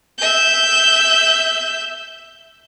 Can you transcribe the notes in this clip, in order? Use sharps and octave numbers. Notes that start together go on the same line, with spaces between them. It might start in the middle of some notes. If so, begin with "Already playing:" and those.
E5 G6